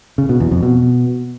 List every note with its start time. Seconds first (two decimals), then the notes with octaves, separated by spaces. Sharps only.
0.18 C#3
0.29 B2
0.40 E2
0.51 F2
0.63 B2